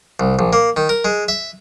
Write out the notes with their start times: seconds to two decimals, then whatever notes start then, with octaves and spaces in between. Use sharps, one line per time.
0.20 C2
0.39 A#1
0.53 A#3
0.77 D#3
0.89 A#4
1.05 G#3
1.28 E5